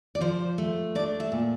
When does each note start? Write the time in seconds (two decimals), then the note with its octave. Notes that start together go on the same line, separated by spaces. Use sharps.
0.15 D5
0.21 F3 C5
0.58 A3
0.95 D4 D5
1.20 E5
1.32 A#2